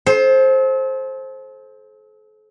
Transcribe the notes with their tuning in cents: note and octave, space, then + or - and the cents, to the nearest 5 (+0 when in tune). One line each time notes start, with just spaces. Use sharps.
A4 -40 C5 +15